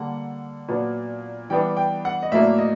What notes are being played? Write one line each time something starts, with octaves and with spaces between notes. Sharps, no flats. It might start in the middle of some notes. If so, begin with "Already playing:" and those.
Already playing: D3 G3 A#3 D4 F#5
A#2 F#3 B3 D4
E3 G3 B3 D4 G5
G5
F#5
D#5
A2 F#3 A#3 D4 E5
D#5